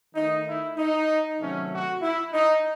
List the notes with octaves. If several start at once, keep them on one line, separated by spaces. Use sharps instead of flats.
D#3 A3 D#4
E4
D#4
C3 D#3 F#3 A3 C#4
F#4
E4
D#4